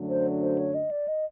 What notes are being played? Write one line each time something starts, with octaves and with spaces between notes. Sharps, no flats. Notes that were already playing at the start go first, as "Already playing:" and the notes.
Already playing: F#2 D3 F#3 A3 D4
C5
C5
C#5
D#5
D5
D#5